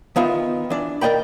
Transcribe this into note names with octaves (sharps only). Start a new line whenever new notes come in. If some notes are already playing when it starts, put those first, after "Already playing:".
D#3 B3 F4 E5
E3 D4
A#4 D5 D#5 G5 B5